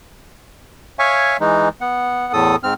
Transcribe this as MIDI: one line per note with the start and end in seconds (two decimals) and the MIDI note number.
0.99 1.37 73
0.99 1.37 76
0.99 1.37 77
0.99 1.37 80
0.99 1.37 85
1.40 1.69 52
1.40 1.69 56
1.40 1.69 63
1.81 2.33 59
1.81 2.33 78
2.33 2.56 40
2.33 2.56 45
2.33 2.56 69
2.33 2.56 87
2.63 2.74 44
2.63 2.74 60
2.63 2.74 89